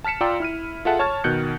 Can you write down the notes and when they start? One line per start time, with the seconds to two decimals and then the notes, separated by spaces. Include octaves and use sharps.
0.04 A5 F6 B6 C#7 E7
0.21 F4 D5 G5 A#5 C6 E6
0.40 E4 F6 D#7
0.85 F4 G#4 A4 E5 F#5 A5
0.99 C#5 A5 C#6 F6 G#6 A6
1.24 B2 D#3 F#6 G6 C#7